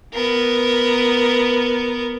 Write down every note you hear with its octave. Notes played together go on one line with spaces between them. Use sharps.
B3 A#4